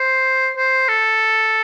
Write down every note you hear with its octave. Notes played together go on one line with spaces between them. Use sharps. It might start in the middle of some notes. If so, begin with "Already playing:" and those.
Already playing: C5
C5
A4